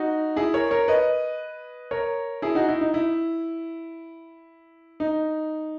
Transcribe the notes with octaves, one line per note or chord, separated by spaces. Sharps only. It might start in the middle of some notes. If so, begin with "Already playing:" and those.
Already playing: D#4 F#4
E4 G#4
A#4 C#5
A#4 C#5
B4 D#5
A#4 C#5
E4 G#4
D#4 F#4
E4
D#4
E4
D#4